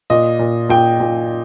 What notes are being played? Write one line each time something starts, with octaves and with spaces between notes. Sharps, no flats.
A#2 D#5
A#2
A#2 G5
A#2